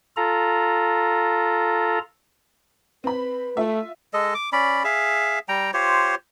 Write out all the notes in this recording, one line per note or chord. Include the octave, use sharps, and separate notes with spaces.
F4 A4 A#5
C4 B4 B5
A3 F4 E5
G#3 A4 D#5
D6
C#4 D5 B5
G#4 E5 F5
G3 G5 A#5
F4 G4 C5 C#5